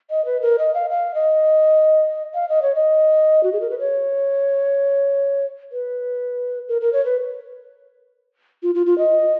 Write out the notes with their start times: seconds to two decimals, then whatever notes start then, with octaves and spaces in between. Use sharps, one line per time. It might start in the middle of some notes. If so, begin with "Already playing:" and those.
0.10 D#5
0.25 B4
0.42 A#4
0.59 D#5
0.74 F5
0.90 F5
1.14 D#5
2.34 F5
2.49 D#5
2.62 C#5
2.75 D#5
3.43 F#4
3.53 G#4
3.61 A#4
3.70 B4
3.79 C#5
5.72 B4
6.69 A#4
6.81 A#4
6.93 C#5
7.05 B4
8.63 F4
8.75 F4
8.86 F4
8.98 D#5